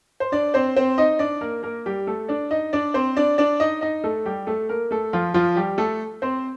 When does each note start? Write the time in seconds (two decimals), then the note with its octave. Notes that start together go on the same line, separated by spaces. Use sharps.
0.20 C5
0.32 D4 D5
0.54 C4 C5
0.76 C4 C5
0.98 D#4 D#5
1.19 D4 D5
1.41 A#3 A#4
1.63 A#3 A#4
1.86 G3 G4
2.07 A3 A4
2.29 D4 D5
2.51 D#4 D#5
2.73 D4 D5
2.94 C4 C5
3.17 D4 D5
3.38 D4 D5
3.60 D#4 D#5
3.81 D#4 D#5
4.04 A3 A4
4.26 G3 G4
4.47 A3 A4
4.69 A#3 A#4
4.91 A3 A4
5.13 F3 F4
5.34 F3 F4
5.56 G3 G4
5.78 A3 A4
6.22 C4 C5